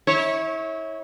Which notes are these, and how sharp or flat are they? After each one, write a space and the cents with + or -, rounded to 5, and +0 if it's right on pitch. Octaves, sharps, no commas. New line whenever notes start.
E4 -30 C#5 -15